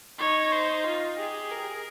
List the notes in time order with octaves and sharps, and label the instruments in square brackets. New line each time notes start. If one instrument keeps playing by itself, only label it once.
[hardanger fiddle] D#4 [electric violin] C#5
[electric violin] C5
F4
[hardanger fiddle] G4 [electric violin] G#4
[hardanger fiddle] A#4